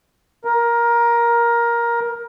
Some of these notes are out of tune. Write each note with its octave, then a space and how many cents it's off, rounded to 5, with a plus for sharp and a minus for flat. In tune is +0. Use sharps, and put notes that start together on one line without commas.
A#4 +15